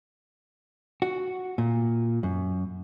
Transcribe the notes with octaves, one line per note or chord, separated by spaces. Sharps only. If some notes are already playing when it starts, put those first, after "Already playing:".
F#4
A#2
F#2